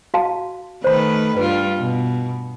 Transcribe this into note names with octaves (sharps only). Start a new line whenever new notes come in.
F#4 F5 A5
D#3 A3 B4 C5 B5
G2 G3 F4 B4
B2